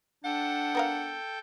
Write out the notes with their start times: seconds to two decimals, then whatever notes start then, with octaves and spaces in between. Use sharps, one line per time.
0.24 D4 A4 F#5 G5
0.75 B3 A#4 F5